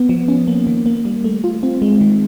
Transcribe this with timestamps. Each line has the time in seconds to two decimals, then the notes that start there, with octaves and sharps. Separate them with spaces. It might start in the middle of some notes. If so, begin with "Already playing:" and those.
Already playing: B3
0.09 F3
0.28 C#4
0.47 A#3
0.67 D#3
0.86 A#3
1.05 G3
1.24 A3
1.44 F4
1.63 C4
1.82 G#3
2.01 D#3